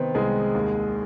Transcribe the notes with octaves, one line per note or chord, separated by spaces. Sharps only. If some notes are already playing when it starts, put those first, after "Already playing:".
Already playing: C3 D#3 B3 C4 B4
C2 G#3 G#4
D#2